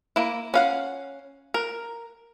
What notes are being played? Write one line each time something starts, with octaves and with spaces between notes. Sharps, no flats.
A#3 E4
C#4 F5 F#5
A#4